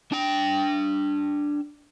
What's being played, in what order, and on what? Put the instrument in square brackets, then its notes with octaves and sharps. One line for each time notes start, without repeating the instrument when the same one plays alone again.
[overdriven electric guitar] D4 G5